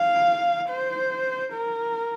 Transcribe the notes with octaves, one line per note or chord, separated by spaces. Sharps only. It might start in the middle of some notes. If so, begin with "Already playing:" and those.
Already playing: F5
C5
A#4